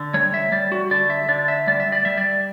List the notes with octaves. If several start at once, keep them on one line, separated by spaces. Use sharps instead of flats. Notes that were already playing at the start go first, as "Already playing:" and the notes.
Already playing: D3
G3 C#5
E5
G3 D5
F#4
D3 D5
E5
D3 D5
E5
G3 D5
E5
D5
G3 E5
D5